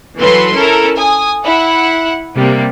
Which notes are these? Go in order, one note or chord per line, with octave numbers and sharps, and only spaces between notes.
E3 F#3 A4 B4 C6
C#4 E4 A4 A#4
G#5 D#6
E4 F#5
C3 G3 A#3